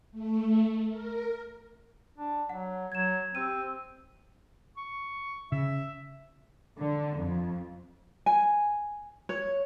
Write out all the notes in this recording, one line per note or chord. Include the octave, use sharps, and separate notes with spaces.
A3
A#4
D4
F#3 F#5
F#3 G#6 E7
C4 G4 E6 D#7
C#6
C#3 E5
D3
F2
G#5
C#5